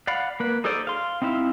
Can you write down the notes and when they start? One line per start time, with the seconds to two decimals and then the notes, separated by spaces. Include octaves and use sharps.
0.07 D5 F5 F#5 B5
0.40 A#3 B4
0.64 D#4 G#4 A4 C5 D5
0.87 F5 C6
1.22 C4 D#4 E4 E5 F5